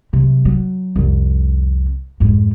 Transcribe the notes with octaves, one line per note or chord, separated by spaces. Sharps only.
C3 F#3
F#3
C2 F2
F2 G#2